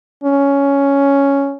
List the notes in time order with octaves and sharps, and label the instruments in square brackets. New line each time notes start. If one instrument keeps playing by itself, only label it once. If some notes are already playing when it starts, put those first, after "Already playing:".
[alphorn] C#4